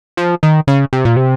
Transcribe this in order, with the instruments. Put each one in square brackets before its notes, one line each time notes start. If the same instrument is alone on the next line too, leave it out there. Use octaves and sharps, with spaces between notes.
[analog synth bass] F3
D#3
C#3
C3
A#2
C3